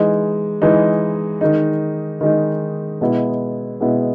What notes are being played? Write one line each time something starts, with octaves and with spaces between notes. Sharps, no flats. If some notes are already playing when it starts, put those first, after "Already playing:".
Already playing: E3 G#3 D#4
E3 G#3 D#4
D#3 G#3 D#4
D#3 G#3 D#4
B2 G#3 B3 E4
B2 G#3 B3 E4